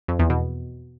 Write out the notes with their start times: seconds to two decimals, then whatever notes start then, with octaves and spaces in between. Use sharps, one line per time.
0.08 F2
0.19 E2
0.30 B2